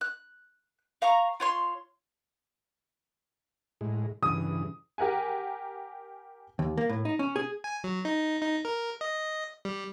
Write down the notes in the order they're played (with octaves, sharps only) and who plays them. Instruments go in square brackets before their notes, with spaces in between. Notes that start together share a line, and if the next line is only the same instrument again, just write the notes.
[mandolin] F#6
F5 A#5 C#6
F4 C#5 C6
[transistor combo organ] A2 G#3
[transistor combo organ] G2 C#3 E3 [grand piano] D#6
[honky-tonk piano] G4 A#4 F#5 G#5
[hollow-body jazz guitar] D#2
A#3
A2
D#4
C#4
G#4
[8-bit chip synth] G#5
F#3
D#4
D#4
A#4
D#5
G3